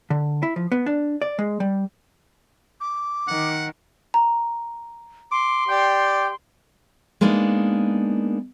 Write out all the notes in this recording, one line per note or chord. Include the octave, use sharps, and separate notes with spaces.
D3
E4
F3
B3
D4
D5
G#3
G3
D6
D#3 F#5
A#5
C6 D6
G4 D5 G5
G#3 A#3 B3 D4 D#4